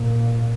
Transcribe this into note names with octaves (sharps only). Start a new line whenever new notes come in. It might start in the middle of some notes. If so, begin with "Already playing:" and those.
Already playing: A#2